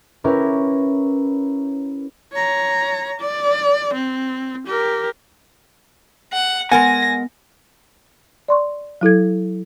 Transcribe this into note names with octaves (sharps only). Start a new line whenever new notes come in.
C#4 E4 G4 A#4 B4
C#5 A#5
D5
C4
G4 A#4
F#5
G#3 B3 A#4 F#5 G#5 A#6
D5 C6 C#6
F#3 E4 A4 G#6